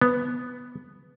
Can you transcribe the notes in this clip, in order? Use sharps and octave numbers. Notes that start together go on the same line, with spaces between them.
B3